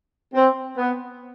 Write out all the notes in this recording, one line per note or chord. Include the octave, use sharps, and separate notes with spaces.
C4
B3